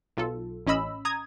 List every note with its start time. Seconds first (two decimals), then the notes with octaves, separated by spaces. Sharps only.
0.17 B1 F4 A4
0.67 A1 C#4 D#5 B5 E6
1.05 A#5 D#6 G#6